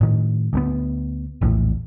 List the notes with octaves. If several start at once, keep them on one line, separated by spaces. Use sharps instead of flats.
A2 D#3
D2 A3 B3
A#1 E2 A2